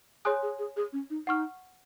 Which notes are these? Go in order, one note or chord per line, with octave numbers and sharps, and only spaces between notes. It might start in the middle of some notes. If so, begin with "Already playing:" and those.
G#4 C#5 G#5 C6 D#6 F#6
G#4
G#4
G#4
C#4
D#4
D#4 F#5 C#6 F6